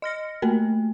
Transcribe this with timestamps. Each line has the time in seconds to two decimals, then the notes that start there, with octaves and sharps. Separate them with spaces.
0.02 D#5 F6 A#6 C#7
0.42 A3 A#3 A#4